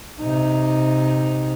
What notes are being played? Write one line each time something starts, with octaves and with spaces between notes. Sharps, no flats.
C3 D#4